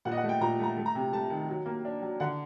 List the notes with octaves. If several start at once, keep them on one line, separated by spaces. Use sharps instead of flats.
A#2 F#5
D#5
F#5
A3
G5
A#2 A#5
A3 A#5
A3
A#5
C3
A3 A5
D#3
F#3
A#3
D4
F#3
D3 F#5